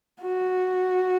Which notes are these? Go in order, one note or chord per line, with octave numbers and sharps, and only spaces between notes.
F#4